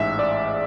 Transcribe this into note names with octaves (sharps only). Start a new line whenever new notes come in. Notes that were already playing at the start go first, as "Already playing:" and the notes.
Already playing: A1 G#2 G#3 E5
D5